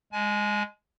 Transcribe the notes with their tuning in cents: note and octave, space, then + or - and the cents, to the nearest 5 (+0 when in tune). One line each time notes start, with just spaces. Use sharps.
G#3 -10 G#5 +30